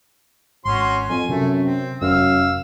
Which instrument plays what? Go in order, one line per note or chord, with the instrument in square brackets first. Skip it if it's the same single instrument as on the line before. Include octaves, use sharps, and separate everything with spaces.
[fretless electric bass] G#1 [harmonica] C#4 F#4 C6
[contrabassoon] F2 [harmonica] G#5
[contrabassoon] F#2 [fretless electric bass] C3 [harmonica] A3
[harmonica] C4
[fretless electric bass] F1 [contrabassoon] F#2 [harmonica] F5 E6